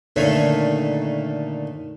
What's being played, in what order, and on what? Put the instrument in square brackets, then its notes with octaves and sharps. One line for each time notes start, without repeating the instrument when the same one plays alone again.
[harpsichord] A#2 D3 D#3 A3 B4 C#5